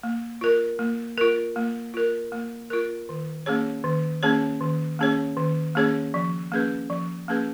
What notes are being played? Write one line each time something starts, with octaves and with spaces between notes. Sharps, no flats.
A#3
F4 A#4
A#3
F4 A#4
A#3
F4 A#4
A#3
F4 A#4
D#3
A#3 C#4 G#4 C#5
D#3
A#3 C#4 G#4 C#5
D#3
A#3 C#4 G#4 C#5
D#3
A#3 C#4 G#4 C#5
F3
A#3 C#4 G#4 B4
F3
A#3 C#4 G#4 B4